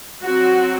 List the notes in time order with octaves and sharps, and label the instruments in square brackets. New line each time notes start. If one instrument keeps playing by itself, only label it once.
[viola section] F#3 C4 F#4